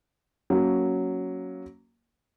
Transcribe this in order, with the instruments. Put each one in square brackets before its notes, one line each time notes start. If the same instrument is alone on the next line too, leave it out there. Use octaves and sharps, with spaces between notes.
[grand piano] F#3 A#3 C#4